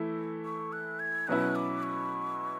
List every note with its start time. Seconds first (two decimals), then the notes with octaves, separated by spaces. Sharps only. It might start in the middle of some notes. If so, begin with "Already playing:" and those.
Already playing: E3 A3 E4
0.45 C#6
0.72 F#6
0.99 G#6
1.27 B2 F#3 C#4 E4 B4 F#6
1.55 D6
1.83 C#6